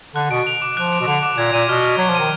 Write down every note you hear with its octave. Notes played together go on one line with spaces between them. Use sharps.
D3 F#6
B2 D7
F7
D6
F3 F#6
D7
B2
D3 F7
D6
A#2 G#6
A#2 D#7
B2 F6
F6
F#3 G#6
F3
D#3 D#7